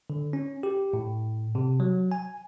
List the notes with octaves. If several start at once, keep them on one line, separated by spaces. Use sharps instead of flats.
D3
C#4
G4
A2
C3
F#3
G#5